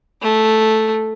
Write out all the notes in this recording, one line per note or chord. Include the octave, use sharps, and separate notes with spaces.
A3